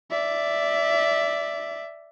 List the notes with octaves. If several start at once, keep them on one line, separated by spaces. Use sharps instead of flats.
D5 E5